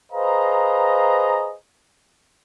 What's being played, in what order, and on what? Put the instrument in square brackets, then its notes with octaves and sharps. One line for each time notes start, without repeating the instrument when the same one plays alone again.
[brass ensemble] G#4 B4 C5 D#5 F5 A#5